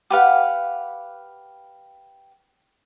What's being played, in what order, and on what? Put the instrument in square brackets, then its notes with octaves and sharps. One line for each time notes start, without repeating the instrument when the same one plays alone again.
[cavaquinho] G4 B4 F5 F#5